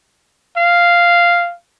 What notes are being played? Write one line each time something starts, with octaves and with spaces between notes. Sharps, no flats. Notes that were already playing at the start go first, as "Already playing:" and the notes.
F5